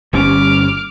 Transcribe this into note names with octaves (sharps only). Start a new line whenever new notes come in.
G1 G3 C#4 D6 F6